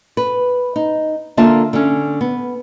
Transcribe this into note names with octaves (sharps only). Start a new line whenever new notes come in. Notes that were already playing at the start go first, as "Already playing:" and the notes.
B4
D#4
D3 A#3 F4 E5 A5
D3 C#4
B3